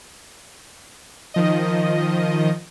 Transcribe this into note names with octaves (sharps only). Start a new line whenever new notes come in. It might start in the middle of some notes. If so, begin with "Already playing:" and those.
D#3 F3 D#5